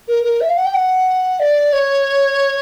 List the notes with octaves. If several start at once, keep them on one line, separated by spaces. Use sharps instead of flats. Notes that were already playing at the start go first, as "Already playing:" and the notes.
A#4
A#4
E5
F5
F#5
G5
F#5
D5
C#5